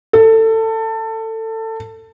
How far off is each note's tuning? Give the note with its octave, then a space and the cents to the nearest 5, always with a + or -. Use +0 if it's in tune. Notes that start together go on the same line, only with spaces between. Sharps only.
A4 +20